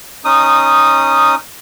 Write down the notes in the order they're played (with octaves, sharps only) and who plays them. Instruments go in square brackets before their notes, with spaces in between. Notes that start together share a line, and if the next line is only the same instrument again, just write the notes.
[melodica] C#4 D#4 D#6